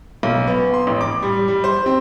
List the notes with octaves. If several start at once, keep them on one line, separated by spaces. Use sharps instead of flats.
B1
B3
C6
A1
D6
G3
G3
C5
C4